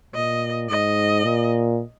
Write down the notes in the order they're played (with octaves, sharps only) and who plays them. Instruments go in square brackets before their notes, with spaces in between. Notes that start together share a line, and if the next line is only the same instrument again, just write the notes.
[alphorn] A#2 [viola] D#5
[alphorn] G#2 [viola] D#5
[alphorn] A#2